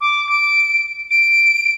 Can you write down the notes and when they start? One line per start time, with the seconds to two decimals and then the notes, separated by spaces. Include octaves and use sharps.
0.01 D6
0.29 D7
1.11 D7